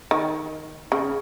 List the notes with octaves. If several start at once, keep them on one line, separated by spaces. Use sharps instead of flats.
D#3
C#3